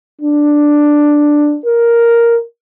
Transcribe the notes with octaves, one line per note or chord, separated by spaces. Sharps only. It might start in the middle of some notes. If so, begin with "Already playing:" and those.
D4
A#4